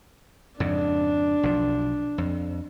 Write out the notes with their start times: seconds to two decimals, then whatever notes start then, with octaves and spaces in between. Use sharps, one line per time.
0.60 F2 G#2 C#3 D4
1.43 B1 F3
2.18 F2